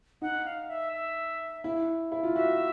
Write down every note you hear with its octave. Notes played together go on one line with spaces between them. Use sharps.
D#4 F#5
F5
E5
E5
E4
E4
F4
F#4 E5